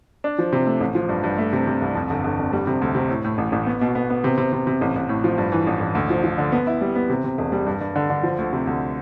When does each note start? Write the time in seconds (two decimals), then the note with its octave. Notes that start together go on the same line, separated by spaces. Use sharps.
0.24 D4
0.38 F3
0.53 C3
0.66 A3
0.80 A1
0.95 F3
1.09 G2
1.24 G2
1.38 A3
1.53 C3
1.67 C3
1.82 C2
1.95 F2
2.10 G1
2.24 G1
2.39 F2
2.53 G3
2.67 C3
2.82 D2
2.95 C3
3.10 A2
3.24 A2
3.38 A1
3.52 A1
3.66 B3
3.81 B2
3.95 B3
4.10 B3
4.24 C3
4.38 C3
4.53 C3
4.67 C3
4.81 A1
4.96 A1
5.09 A2
5.24 F3
5.38 G2
5.52 E3
5.67 A1
5.80 A1
5.95 D2
6.10 F3
6.24 F3
6.38 D3
6.52 B3
6.67 E4
6.81 G3
6.95 B3
7.10 C3
7.24 C3
7.38 E1
7.52 G3
7.67 G2
7.81 G2
7.96 D3
8.10 D3
8.23 F3
8.38 D2
8.53 C3
8.67 D2